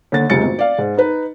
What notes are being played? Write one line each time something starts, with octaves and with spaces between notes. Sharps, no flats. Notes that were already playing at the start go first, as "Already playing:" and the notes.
D#2 D3 A6
F1 C#2 G3 G#4 A6 C#7
G#1
D5 F5
G#2
D#4 B4